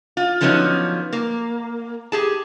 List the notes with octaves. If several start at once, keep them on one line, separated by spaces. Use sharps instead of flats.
F4
D3 F3 F#3 B3 C#4 D#4
A#3
G4 G#4 A5